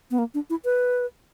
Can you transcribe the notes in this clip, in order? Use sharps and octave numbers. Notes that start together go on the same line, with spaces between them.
B3
A#3
D4
E4
B4